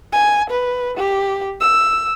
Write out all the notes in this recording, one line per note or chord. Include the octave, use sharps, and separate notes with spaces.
G#5
B4
G4
E6